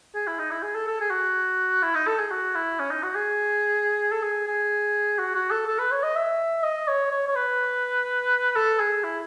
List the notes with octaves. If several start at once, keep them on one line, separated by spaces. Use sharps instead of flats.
G#4
E4
D#4
E4
G#4
A4
A4
G#4
F#4
E4
D#4
A4
G#4
F#4
E4
C#4
D#4
F#4
G#4
A4
G#4
G#4
F#4
F#4
A4
A4
B4
C#5
D#5
E5
D#5
C#5
C#5
C#5
B4
A4
G#4
E4